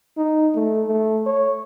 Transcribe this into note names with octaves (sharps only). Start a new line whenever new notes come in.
D#4
A3
A3
C#5